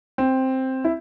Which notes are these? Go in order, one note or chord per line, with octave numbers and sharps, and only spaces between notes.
C4
E4